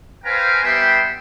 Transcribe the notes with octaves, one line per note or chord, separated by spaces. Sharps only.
B4 C5 F5 G5 G#5 A#5
G3 B3 B4 E5 G5 C6